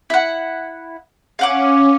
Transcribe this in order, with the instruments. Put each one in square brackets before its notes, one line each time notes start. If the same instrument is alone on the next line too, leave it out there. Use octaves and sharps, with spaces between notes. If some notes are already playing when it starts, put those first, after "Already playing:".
[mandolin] E4 F#5
[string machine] C#4 [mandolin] F5 F#5 D6